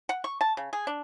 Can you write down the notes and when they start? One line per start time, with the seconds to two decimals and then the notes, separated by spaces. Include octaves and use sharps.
0.09 F#5
0.24 C#6
0.41 A5
0.57 C#3
0.73 G#4
0.87 D4